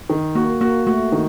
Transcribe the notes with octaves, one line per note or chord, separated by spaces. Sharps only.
D#3
A#3 F#4
A#3 F#4
A3 F#4
D#3